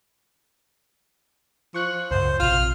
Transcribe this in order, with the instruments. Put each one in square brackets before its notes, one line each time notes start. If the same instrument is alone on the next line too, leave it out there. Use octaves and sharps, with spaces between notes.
[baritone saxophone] F3 [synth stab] C#6 F#6 C#7
[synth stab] C#2 F#2 [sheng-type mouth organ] C5
[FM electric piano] A#1 C3 [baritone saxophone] F4 [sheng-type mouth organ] F6